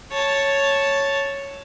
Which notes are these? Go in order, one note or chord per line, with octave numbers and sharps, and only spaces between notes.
C#5 A5